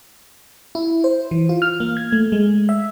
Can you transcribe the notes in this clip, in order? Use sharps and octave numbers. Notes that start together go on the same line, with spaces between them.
E4
C5
E3
F4
F6
A#3
G#6
A3
G#3
E5